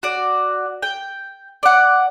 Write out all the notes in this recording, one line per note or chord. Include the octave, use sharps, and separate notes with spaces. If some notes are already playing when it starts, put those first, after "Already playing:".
F#4 D5
G5
D5 F#5